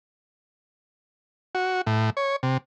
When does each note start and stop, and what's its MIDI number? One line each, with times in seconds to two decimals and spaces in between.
1.55 1.81 66
1.87 2.10 45
2.17 2.36 73
2.43 2.57 48